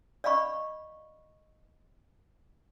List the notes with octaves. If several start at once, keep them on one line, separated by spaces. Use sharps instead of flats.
D5 D#5 F5 B5 C#6